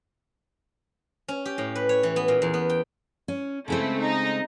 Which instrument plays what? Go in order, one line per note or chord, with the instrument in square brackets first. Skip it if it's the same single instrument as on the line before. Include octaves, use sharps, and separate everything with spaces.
[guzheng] C#4
G4
A2
B4
C#5
E3
B3
A#2
E2
B3
G5
[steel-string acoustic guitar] C#4
[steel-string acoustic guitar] C#3 G#3 C4 [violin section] A3 E4
[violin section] D#4